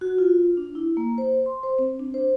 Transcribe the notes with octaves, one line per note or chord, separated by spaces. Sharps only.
F#4
F4
D4
E4
A#3
C5
C6
C5
C4
D4
C5